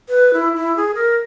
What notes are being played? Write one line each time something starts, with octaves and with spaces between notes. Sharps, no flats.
B4
E4
E4
G#4
A#4